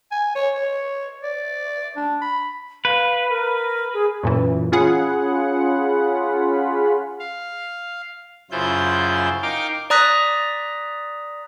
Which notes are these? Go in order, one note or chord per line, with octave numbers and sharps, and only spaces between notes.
G#5
C#5
C#5
D5
D4
B5
B4 F5
A#4
G#4
F#2 A#2 E3
C#4 F4 G#4 F#5 B5
F5
F#2 C#3 E4 F4 C5 G6
D#4 A#4 F5 G5 D6
D5 A#5 D#6 F#6 A#6 B6